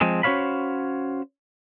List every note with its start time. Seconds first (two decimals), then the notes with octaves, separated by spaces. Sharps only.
0.01 F3 G#3 C4 G#4
0.23 C#4 F#4 C5 C#5 F5 B5